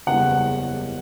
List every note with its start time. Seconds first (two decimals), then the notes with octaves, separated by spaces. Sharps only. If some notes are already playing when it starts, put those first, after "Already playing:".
0.07 F#1 E2 C#3 E3 G3 F#5